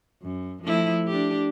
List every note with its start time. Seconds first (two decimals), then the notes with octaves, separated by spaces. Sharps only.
0.22 F#2
0.63 F3 A3 E4
1.07 D4 G4